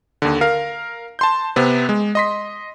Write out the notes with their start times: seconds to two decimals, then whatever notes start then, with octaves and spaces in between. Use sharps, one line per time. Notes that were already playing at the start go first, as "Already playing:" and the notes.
0.22 D#2 D3
0.41 A#4 F5
1.19 A5 C6 G6
1.56 C3 B3 C4
1.89 G#3
2.15 D#5 C6 B6